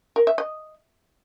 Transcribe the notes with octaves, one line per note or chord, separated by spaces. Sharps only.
A#4
E5
D#5